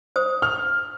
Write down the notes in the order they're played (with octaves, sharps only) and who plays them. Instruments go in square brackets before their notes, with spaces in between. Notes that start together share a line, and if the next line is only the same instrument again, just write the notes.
[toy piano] C5 D#6
[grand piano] F6